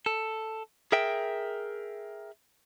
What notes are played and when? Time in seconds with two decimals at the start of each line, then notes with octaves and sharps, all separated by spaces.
0.06 A4
0.92 G#4 A#4 E5 G5